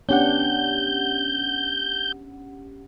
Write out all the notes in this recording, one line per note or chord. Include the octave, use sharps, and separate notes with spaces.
B3 C#4 D4 G4 F#5 G6